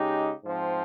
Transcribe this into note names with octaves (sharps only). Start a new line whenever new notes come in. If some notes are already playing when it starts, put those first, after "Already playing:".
Already playing: C#3 G#3 D#4 G4
G#2 F3 C4